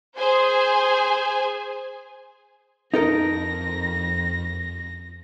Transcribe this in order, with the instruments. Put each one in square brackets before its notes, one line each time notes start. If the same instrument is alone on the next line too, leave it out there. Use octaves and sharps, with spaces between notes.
[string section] G#4 C5 G#5
[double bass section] F2 [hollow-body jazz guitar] D#4 A4 A#4 [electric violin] A#6